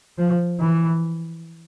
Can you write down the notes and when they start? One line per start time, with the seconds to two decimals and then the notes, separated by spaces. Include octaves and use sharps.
0.18 F3
0.60 E3